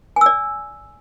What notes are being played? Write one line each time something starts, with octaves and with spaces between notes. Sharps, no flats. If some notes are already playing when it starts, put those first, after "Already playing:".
D5 G#5 E6